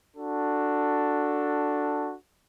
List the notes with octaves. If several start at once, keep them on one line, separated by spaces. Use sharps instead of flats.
D4 F#4 A4